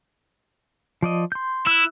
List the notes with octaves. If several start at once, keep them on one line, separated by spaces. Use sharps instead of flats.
F3 D5 D#5
C6 G6
E4 E6 F#6